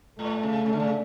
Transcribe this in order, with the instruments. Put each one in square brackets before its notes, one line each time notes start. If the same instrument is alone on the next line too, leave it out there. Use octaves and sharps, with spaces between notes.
[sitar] A2 [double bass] A3
[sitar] C#3
C#3
D3
C#3